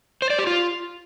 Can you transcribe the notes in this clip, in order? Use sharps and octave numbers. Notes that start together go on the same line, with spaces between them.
C5
D5
G4
F4